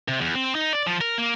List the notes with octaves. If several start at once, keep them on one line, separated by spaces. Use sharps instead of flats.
C3
E2
C4
D#4
D5
F3
A#4
A#3